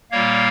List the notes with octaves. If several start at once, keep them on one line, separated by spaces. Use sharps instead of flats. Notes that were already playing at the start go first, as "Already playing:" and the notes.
A#2 G3 A#3 C#5 F5